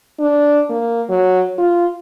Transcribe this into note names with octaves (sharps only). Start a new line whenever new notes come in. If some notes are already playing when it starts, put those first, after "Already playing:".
D4
A#3
F#3
F4